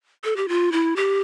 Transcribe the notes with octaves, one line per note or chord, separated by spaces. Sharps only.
A4
G4
F4
E4
G4